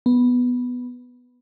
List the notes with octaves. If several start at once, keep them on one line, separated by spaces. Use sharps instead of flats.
B3